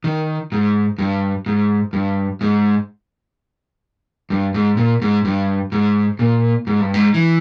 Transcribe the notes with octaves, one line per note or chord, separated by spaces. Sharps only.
D#3
G#2
G2
G#2
G2
G#2
G2
G#2
A#2
G#2
G2
G#2
A#2
G#2
G2
G#2
E3